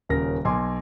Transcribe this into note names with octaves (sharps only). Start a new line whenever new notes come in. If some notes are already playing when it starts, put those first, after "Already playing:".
D#1 C#3 A#4 A#6
B1 G#5 C6 D6